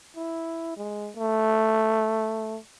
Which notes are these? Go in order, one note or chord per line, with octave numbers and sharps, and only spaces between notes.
E4
G#3
A3